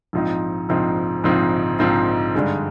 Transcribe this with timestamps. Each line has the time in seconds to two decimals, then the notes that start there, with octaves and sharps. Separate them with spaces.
0.13 A#1 G#2 F3 C4 D#4
0.69 A#1 G#2 F3 C4 D#4
1.24 A#1 G#2 F3 C4 D#4
1.79 A#1 G#2 F3 C4 D#4
2.35 G2 D3 G#3 D#4